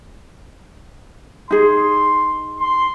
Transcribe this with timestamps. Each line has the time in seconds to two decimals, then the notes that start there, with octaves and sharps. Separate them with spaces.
1.51 D#4 G#4 C6
2.60 C6